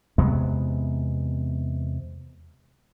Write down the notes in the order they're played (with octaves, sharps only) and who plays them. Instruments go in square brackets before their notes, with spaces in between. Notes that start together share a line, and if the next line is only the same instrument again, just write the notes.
[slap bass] E2 C3 G#3 B3